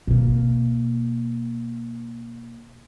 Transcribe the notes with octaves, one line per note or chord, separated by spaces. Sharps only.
B2 A#3